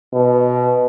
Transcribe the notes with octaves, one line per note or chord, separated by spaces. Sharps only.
B2